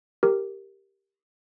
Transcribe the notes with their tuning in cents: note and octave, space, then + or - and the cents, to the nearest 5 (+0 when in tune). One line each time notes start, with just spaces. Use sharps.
G4 +0 A#4 -5